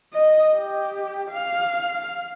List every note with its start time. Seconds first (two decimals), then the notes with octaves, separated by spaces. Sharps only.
0.14 D#5
0.55 G4
1.32 F5